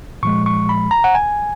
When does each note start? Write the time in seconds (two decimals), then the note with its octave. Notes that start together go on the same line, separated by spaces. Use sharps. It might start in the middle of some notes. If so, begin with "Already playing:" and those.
0.23 A#2 F3 G#3 C#6
0.46 C#6
0.69 B5
0.91 A#5
1.04 F#5
1.15 G#5